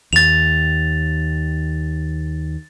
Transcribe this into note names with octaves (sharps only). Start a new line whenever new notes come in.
D#2 A6 F7